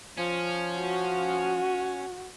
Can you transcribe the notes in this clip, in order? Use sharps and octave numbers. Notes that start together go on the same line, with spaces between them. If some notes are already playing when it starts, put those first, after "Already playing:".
F3 C#4
F#4